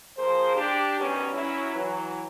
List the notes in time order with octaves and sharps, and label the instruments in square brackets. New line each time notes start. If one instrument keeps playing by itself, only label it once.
[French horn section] F3 A#3 G#4 C5
D4 G4
D#3 F#3 G3 B3 C#4
F#3 C#4 E4
E3 F#3